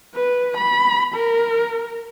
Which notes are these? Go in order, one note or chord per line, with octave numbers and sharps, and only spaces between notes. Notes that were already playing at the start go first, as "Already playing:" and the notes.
B4
B5
A#4